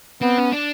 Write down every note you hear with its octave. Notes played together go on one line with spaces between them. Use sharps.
B3 C4
C#4
D4